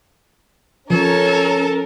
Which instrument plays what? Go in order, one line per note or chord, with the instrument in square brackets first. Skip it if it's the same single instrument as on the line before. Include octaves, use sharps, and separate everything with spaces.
[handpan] F3 [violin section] C#4 A#4 [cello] A4 [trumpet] C#5